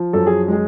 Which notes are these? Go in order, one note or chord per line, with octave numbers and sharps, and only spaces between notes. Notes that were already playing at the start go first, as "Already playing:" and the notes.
Already playing: F3
F#2 A4
G#4
G#3 G#4